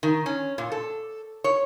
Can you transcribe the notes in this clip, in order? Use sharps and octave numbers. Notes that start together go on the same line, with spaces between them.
D#3
C#4
A#2
A4
C#5